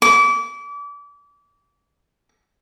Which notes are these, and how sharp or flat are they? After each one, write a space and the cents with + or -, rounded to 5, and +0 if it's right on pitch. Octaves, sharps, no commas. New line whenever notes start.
D6 -30